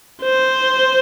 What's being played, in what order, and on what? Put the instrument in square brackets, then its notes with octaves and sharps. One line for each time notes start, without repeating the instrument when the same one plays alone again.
[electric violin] C5